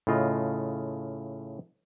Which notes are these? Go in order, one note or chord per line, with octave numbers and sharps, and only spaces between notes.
A2 C#3 F4 D#5